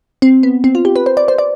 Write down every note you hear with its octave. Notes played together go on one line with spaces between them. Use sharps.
C4
B3
C4
F4
G4
B4
C5
D5
C5
D5